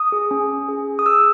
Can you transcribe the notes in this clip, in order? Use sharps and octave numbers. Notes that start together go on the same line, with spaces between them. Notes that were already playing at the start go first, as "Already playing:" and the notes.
Already playing: D#6
G#4
C#4
C#4
G#4
G#4
D#6
G#4 E6